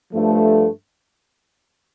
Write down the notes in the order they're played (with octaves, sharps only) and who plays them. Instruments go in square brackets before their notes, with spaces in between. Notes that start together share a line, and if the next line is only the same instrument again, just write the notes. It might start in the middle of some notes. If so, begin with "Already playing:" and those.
[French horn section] G2 F3 A3